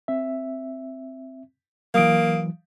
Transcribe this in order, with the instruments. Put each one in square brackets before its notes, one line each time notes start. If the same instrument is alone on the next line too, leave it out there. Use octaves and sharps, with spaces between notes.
[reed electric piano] C4 E5
[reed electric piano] E3 F#3 [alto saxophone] A#3 [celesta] F5 D#6 D7